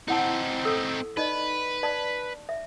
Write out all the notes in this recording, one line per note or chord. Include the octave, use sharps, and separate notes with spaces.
C4 D#4 E4 F#5 A5
A4 E6
D#4 B4 D5 D#5
D5 A5
E5